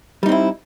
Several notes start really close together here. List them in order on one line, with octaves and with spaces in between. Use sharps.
G3 D#4 C4 E4